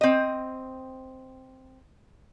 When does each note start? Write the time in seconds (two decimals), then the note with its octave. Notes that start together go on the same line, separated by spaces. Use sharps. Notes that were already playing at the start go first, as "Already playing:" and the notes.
0.01 C4 D#5